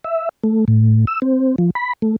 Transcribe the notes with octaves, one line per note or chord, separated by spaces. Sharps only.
E5
A3
A2
E6
C4
F3
B5
A3